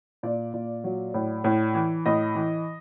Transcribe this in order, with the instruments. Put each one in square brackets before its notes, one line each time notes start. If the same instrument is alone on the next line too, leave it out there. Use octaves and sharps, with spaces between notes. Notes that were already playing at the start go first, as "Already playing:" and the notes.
[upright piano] A#2 D5
A#2
F#3
A2
A2
E3
A2 D#5
E3